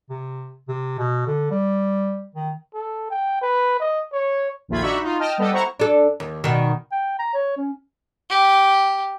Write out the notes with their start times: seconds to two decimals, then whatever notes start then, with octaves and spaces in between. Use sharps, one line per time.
0.10 C3
0.68 C3
0.99 B2
1.27 D3
1.51 G3
2.35 D#3
2.74 A4
3.10 G5
3.42 B4
3.80 D#5
4.12 C#5
4.68 A#1 D#2 A3 F4 B5 G#6
4.81 D4 D#4 F#4 E5 B5 C#6
5.02 D#4 F4
5.19 D#5 G5 A5 F6
5.38 G3 B3 A4 D#5 G5
5.53 E4 C5 F#5 A#5 C#6
5.80 D4 A4
6.20 D#2
6.44 B2 D#3
6.92 G5
7.19 A#5
7.34 C#5
7.57 C#4
8.30 G4